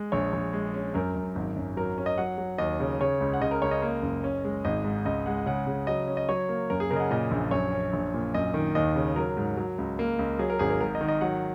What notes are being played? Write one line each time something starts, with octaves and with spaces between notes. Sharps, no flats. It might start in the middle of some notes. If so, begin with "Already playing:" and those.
Already playing: G#3
A#1 C#5
A#1
G#3
C#4
F#2 A#4
F#2
G#1
F#2
F#3 A#4
C#4
D#5
F#3 F#5
F#3
D#2 D#5
C#3
C#3 C#5
C#2
F#5
C#3 D#5
A#4
C#2 C#5
D#5
A#3
F#1
C#4
G#3
G#1 D#5
G#2
C#2 D#5
G#3 F#5
C#3 F#5
C#3
F#3 D#5
C#4
D#5
F#3 C#5
A#3
F#2 A#4
G#4
C#3 A#4
D#5
F#5
A#2 D#5
A#1
F#2 C#5
C#4
A#1
A#2
F#2 D#5
D#3
D#2 D#5
C#3
F#3 A#4
G#2
F#3
C#2
A#3
C#2
F#3 G#4
A#4
G#1 G#4
A#4
G#2 A#4
D#5
D#3
D#5
F#3 F#5